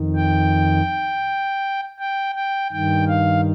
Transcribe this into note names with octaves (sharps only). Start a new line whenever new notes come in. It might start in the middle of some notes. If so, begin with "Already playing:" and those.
Already playing: F2 D#3
G5
G5
G5
G2 D#3 G5
F5